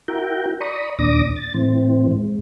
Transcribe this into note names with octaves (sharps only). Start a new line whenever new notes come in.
E4 F#4 A#4 G5
D5 A#5 B5 C#6 D#6
D#2 A#2 D4 D6 D#6 A#6
A6
A2 E3 C4
G#2